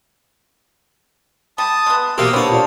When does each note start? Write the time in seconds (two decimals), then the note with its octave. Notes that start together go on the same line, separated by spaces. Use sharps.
1.58 G3 A5 D#6
1.86 G#3 B3
2.18 B2 A#3 C4 G4 F5 D#6 E6
2.33 A#2 B3 D4 G4 C5 C#5 F5
2.52 F4 D5